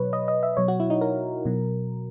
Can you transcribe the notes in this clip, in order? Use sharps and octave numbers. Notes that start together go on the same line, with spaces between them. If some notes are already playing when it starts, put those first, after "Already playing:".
Already playing: B2 F#3 B4 C#5
D#5
D#5
E5
B2 F#3 C#5
F#4
E4
D#4
A#4
B2 F#3